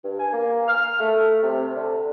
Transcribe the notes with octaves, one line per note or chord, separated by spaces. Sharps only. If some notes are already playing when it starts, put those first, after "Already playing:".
G2
G#5
A#3
F6
A3
C3
D3